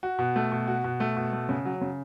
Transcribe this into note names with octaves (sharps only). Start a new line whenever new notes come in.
F#4
B2
A3
B2
F#4
B2
A3
B2
A3
C#3
F#3
C#3